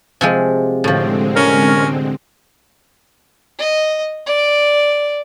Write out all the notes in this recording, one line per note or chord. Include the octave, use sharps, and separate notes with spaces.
C3 F3 G#3
A2 D3 F3 G#3 C4
C#4 A#4
D#5
D5